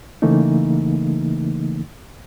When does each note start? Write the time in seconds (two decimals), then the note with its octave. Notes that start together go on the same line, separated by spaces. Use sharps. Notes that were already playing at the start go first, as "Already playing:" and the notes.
0.22 C#3 E3 A3 A#3 D#4